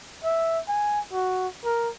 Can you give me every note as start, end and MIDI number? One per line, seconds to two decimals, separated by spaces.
0.23 0.59 76
0.68 1.00 80
1.13 1.48 66
1.64 1.89 70